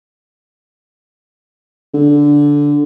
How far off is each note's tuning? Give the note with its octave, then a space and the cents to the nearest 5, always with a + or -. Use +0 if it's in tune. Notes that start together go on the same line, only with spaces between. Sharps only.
D3 -10